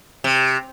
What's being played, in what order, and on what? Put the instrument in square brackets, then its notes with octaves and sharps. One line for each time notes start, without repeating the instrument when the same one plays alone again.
[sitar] C3